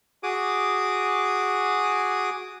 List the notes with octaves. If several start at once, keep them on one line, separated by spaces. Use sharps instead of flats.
F#4 G#4 D6 D#6